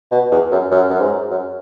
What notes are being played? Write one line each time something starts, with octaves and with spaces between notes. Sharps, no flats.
B2
E2
F#2
F#2
F#2
G#2
F#2